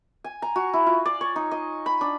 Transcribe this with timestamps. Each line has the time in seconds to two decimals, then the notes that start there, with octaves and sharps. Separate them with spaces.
0.24 G#5
0.42 A#5
0.56 F#4
0.74 E4
0.87 F4
1.05 D5
1.21 C#5
1.36 D#4
1.51 D#5
1.86 B5
2.01 D4